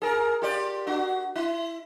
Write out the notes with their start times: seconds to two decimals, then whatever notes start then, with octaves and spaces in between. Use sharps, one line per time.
0.02 G#4 A#4
0.42 F4 G4 D5
0.87 D4 F#4
1.36 E4